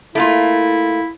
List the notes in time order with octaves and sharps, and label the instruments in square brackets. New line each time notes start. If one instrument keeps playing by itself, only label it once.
[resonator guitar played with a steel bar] A3 A#3 F4 [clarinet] E4